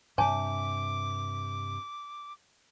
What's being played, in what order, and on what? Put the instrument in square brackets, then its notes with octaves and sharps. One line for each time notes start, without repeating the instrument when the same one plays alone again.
[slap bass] G2 C3 [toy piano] C#5 G#5 A5 [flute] D6